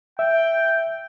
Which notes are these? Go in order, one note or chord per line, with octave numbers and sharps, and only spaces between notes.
E5 G5